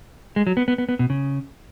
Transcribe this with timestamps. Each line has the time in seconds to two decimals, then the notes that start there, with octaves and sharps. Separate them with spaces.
0.36 G#3
0.47 F#3
0.57 B3
0.68 B3
0.78 B3
0.89 B3
0.99 B2
1.10 C#3